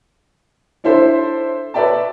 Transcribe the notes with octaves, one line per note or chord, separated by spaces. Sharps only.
D4 E4 A4 C5 E5
B4 C#5 D5 E5 G5 A5